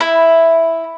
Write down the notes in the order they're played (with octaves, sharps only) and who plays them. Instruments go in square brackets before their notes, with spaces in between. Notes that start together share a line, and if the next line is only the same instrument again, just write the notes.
[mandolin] E4